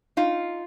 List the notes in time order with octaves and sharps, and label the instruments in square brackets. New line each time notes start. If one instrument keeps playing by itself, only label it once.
[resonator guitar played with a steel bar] D#4 F4